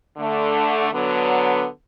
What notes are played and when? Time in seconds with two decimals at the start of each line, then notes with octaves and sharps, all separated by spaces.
0.17 D3 A3
0.92 D3 F#3 B3